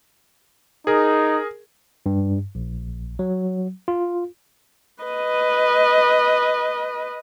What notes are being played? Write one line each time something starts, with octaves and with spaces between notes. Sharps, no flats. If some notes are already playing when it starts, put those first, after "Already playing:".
D#4 G#4 A#4
G2
A#1
F#3
F4
B4 D#5